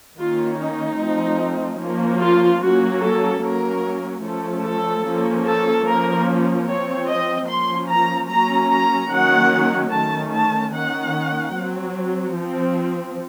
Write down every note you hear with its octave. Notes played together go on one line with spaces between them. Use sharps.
D#3 A#3 C#4 F4
D#4
F3 A3 C4
F3 A#3 C#4
F4
F#3 A#3 C#4 F#4
A4
F#3 A#3 C#4 A#4
F3 A3 C#4 A4
A4
F3 A#3 C#4
A4
F3 A#3 C#4 A#4
F3 C4 C#5
D#5
F3 A#3 C#4 C6
A#5
F#3 A#3 C#4 A#5
A#5
D#3 F#3 A#3 C#4 F#5
D#3 A3 C#4 A5
A5
D#3 A#3 C#4 F#5
F#3 C4
F3 C4